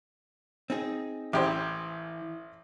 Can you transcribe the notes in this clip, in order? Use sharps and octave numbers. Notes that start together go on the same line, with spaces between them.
C4 D#4 G#4
A1 E3 G4 C5